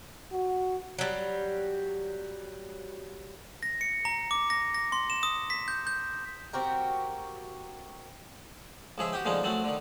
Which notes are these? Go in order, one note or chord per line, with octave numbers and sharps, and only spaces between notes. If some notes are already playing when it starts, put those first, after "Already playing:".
F#4
F#3 G3
A#6
C#7
A#5
D6
A#6
A#6
C6
E7
D#6
B6
G6
G6
C4 F#4 G4 A#4
C#2 F3 G#4 E5
F#4 G4 G5
A#2 D3 F3 G#3 C#4 D#4
F#2 F#3 A3 C4 F#5
D3 D#3